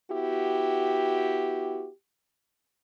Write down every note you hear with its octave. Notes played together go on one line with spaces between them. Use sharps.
B3 E4 F#4 G4